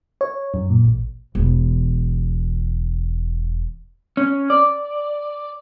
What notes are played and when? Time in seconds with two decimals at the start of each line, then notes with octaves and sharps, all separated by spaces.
0.21 C#5
0.54 F#2
0.70 A#2
0.85 A1
1.35 E1 E3
4.17 C#4
4.50 D5